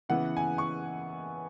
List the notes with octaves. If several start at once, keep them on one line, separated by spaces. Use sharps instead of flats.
C#3 E3 B3 E4 F#5
G#5
C#6